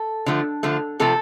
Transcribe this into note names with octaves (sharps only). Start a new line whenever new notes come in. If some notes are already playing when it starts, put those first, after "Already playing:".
Already playing: A4
D3 F3 A3
D3 F3 A3
C3 F3 A3 A4